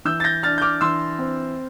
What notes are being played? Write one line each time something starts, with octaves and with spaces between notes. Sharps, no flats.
E3 E6 G6
A6
G6 A#6
D4 F6 A6
G6
D6 F6
E3 C6 E6
C4